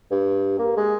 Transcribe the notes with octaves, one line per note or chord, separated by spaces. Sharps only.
G2
A#3
G#3